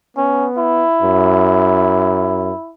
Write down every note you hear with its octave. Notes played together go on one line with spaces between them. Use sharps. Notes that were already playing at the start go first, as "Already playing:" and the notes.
B3 C#4
E4
F#2